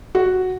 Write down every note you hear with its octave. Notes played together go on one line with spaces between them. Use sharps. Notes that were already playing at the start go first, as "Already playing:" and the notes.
F#4